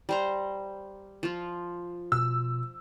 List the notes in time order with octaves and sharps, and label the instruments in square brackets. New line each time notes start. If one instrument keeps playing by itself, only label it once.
[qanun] G3 C5 A#5
F3 F4
[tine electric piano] B2 [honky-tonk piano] E6